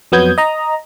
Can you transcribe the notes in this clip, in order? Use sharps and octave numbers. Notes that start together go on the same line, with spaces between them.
F2 F#3 B3 D#6 G6 G#6
D#5 A#5